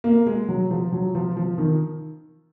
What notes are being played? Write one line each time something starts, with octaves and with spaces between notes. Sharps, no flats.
A#3
G#3
F#3
F3
F#3
F3
F3
D#3